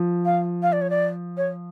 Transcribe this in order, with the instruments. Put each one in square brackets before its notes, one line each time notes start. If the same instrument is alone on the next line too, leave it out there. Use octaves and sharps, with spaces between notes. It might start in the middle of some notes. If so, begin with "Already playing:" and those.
Already playing: [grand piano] F3
[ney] F5
F5
D5
C#5
D5
C#5